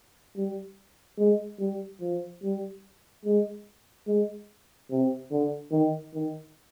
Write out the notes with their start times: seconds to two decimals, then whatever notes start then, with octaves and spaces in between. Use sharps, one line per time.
0.36 G3
1.18 G#3
1.59 G3
2.01 F3
2.43 G3
3.25 G#3
4.07 G#3
4.90 C3
5.31 D3
5.71 D#3
6.14 D#3